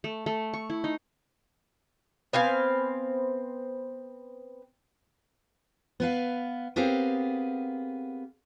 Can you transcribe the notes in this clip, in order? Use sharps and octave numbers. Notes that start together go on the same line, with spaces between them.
A3
A3
C#6
E4
D#4
B3 C4 F5 G#5
B3 B4 F5
B3 C4 G4 G#4 A#4 F5